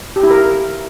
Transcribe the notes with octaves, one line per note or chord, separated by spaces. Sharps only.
G4
E4
A#4